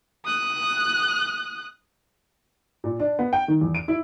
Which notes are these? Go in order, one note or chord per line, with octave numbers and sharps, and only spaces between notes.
D#6 F#6
A#2
D4
B3
G5
D#3
E2
D7
E4